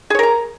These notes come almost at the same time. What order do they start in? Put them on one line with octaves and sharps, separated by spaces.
G#4 C#5 A#4 A#5